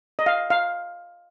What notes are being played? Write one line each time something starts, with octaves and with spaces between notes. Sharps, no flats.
D#5
F5
F5